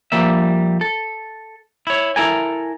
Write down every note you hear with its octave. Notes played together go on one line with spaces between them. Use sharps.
F3 G3 A#3 E5
A4
E4 C#5
E4 A4 A#4 G#5